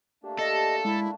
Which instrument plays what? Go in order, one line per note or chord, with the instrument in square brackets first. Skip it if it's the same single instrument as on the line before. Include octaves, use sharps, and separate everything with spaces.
[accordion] A3 A#3 D4 [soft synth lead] G4
[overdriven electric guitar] A4 [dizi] D#5
[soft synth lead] G#3 [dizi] E4